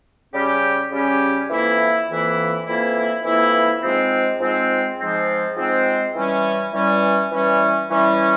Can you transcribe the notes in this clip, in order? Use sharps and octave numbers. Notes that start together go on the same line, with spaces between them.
C#3 G3 C#4 G4
C#3 G3 C#4 G4
F2 E3 A#3 E4
F2 E3 A#3 E4
F2 E3 A#3 E4
F2 E3 A#3 E4
G#2 F3 G#3 C4
G#2 F3 G#3 C4
G#2 F3 G#3 C4
G#2 F3 G#3 C4
E3 G3 C#4
E3 G3 C#4
E3 G3 C#4
E3 G3 C#4